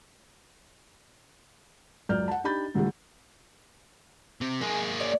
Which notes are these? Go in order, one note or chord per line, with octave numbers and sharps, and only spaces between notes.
C#2 F#2 D5 F6 G6
F#5 A5
D4 D#4 G4 B5 G6 A6
C2 D3 E3 F3 G3 A3
C3
G#3 A#3 G#4
C#5 D5